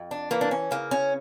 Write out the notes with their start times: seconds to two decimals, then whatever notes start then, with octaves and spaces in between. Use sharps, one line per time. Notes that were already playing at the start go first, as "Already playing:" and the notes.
Already playing: F2
0.11 D4
0.31 E3 A#3
0.41 D4
0.51 C#4
0.71 C#3 A#3
0.91 C#4